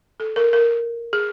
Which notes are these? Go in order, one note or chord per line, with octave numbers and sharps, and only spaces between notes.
A4
A#4
A#4
G#4